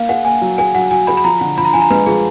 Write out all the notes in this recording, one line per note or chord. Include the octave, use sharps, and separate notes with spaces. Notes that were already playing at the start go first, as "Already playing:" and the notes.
Already playing: A#3 F5
G#4 F#5
A#3 G#5
F#3
G#4 G#5
F#3 F#5
F#3 G#5
G#4 B5
B5
F3 A#5
D3
F3 B5
A#5
F3 G#5
A#5
G#3 B4
F3 G#4